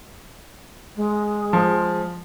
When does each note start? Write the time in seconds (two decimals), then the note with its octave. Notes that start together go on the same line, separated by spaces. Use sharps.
0.96 G#3
1.53 F3